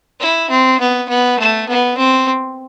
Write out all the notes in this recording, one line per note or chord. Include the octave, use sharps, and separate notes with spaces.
E4
C4
B3
B3
A3
B3
C4